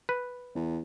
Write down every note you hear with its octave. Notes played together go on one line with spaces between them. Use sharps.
B4
E2